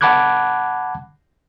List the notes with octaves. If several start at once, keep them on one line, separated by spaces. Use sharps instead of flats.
F#5 A5 B5 D6 F#6 G#6